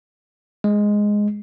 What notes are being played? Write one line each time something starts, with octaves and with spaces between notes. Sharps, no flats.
G#3